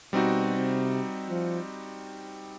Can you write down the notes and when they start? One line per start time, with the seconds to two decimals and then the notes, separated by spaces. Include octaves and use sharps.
0.13 B2 G3 C4 D#4 F#4
0.57 C3
1.29 F3